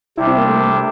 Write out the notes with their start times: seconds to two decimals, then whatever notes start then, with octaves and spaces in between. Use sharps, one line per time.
0.17 C3 G3 D4 E4
0.27 C4
0.37 A#3
0.48 A3